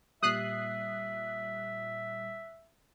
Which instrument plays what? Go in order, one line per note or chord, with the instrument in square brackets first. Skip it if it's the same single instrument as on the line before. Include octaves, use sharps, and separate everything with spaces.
[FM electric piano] A#2 G3 [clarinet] E5 [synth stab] D#6 F#6 C7